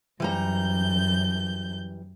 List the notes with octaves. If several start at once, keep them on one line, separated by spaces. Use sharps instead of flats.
F#2 E3 G3 A#5 G6